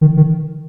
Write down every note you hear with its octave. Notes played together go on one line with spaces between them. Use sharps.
D#3
D#3